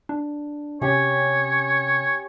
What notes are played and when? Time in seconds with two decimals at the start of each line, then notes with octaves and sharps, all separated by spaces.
0.09 D4
0.82 C3 C#4 G4 C#5